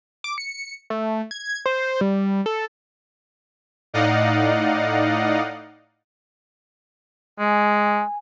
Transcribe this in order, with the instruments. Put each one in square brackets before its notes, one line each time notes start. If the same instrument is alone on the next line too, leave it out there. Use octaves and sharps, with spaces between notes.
[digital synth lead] D6
C#7
A3
G#6
C5
G3
A4
[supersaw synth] A2 D#4 D5 D#5 F5 F#5
[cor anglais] G#3 [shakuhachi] G#5